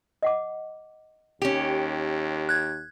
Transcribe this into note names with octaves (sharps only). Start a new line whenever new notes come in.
D#5 F#5 D6
D#2 C#4 G4
F#6 G#6